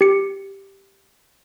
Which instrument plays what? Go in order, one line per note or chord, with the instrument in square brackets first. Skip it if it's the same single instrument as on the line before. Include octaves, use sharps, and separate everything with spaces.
[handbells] G4 C#7